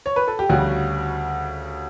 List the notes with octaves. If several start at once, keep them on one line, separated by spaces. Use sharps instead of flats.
C#5
B4
A4
G4
D2 C#3 G3 F#4